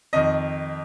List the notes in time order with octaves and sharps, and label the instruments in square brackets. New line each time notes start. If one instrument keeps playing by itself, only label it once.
[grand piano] F2 D#3 D#5